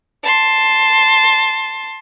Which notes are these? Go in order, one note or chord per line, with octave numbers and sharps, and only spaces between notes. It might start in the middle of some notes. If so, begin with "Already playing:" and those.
A5 C6